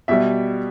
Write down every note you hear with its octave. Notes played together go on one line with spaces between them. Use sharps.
B2 G3 E5